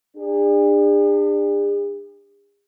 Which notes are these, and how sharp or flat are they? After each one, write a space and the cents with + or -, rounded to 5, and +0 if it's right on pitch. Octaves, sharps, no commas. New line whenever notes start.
D4 +25 G#4 -45